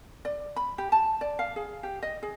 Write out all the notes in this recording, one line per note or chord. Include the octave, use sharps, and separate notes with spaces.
D5
B5
G4
A5
D5
F5
G#4
G4
D#5
G#4